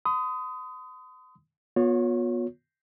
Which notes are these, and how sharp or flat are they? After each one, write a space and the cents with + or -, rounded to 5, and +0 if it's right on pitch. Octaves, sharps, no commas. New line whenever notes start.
C6 -45 D#6 +10
B3 -25 F4 +45 C#5 +0